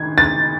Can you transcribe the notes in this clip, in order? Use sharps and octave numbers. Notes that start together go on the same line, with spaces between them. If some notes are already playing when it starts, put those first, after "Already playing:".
Already playing: D#3 D#4 G#6
A6